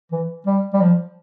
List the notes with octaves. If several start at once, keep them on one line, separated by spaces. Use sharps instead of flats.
E3
G3
G3
F3